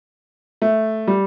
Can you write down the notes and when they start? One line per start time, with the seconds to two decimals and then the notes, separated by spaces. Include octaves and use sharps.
0.62 A3
1.07 G3